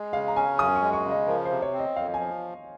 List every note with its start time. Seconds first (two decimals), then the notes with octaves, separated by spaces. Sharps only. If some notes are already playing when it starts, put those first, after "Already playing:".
Already playing: G#3
0.13 C#3 F5
0.28 A#5
0.35 C#4 G#5
0.58 F#2 D#6
0.76 C#6
0.82 G#3
0.93 C#6
1.05 C#3
1.11 D#5
1.27 F3 A#4
1.45 C5
1.50 C3
1.62 C#5
1.73 C4
1.79 D#5
1.96 F2 F5
2.14 G#5
2.20 F3